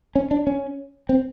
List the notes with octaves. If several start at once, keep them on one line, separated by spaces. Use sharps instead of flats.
C#4
D4
C#4
C4